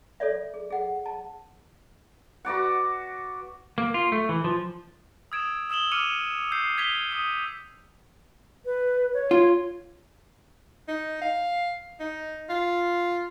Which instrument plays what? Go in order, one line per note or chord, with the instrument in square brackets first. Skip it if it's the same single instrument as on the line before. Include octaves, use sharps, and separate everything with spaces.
[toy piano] A4 C#5 D5 E5
G#4
G#4 F#5
A5
[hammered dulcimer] F#4 B4 D5 F#5
[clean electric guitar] A#3
F4
A3
E3
F3
[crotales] D#6 E6 G#6 D7 E7
D#6 E6 E7 F#7 G7
D6 F6 C#7 D#7 F7
E6 G6 C7
G#6 B6 F7 G7
D#6 D#7
[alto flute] B4
C#5
[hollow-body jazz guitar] F4
[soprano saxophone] D#4
F5
D#4
F4